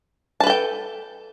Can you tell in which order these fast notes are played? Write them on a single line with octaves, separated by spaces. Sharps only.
A5 B4 A4 G5